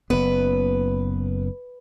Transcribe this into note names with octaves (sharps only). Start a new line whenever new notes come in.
F#1 B3 B4